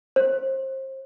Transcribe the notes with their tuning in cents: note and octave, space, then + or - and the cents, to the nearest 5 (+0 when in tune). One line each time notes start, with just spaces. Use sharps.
C5 +30